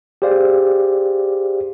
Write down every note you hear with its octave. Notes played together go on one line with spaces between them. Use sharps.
G4 G#4 C5 D5 F5